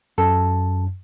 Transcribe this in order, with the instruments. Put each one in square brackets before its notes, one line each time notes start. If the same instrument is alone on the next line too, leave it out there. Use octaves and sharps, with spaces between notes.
[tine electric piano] F#2 [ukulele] A4